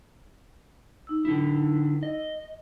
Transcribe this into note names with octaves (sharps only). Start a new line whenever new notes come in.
D#4 E6
D3 E4
D#5